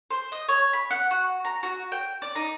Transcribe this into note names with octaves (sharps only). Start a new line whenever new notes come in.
C5
D#5
C#5
B5
F#5
F#4
A#5
F#4
G5
D5
D#4